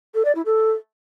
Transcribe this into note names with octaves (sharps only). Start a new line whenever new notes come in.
A4
D5
E4
A4